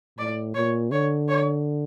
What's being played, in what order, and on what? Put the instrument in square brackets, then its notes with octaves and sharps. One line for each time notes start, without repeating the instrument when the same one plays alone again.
[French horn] A2 [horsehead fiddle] D5
[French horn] A#2 [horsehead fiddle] C#5
[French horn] D3 [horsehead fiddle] C#5
[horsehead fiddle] C#5